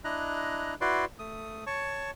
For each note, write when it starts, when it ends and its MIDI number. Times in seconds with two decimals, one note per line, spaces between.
0.04 0.75 62
0.04 0.75 64
0.04 0.75 75
0.04 0.75 82
0.04 0.75 90
0.81 1.05 64
0.81 1.05 66
0.81 1.05 71
0.81 1.05 74
0.81 1.05 84
1.19 1.64 57
1.19 1.64 87
1.67 2.11 73
1.67 2.11 81
1.67 2.11 85